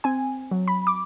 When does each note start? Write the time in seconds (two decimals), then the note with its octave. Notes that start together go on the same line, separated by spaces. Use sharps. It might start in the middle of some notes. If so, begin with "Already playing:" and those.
0.04 C4 G#5
0.51 F#3
0.68 B5
0.87 D6